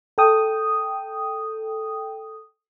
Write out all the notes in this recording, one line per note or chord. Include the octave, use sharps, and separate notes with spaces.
A4 G5 D#6